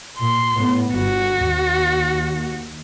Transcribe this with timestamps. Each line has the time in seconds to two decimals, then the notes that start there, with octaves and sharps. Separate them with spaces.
0.19 A#2 C6
0.54 A2 B3
0.95 G1 F#4
1.48 D#2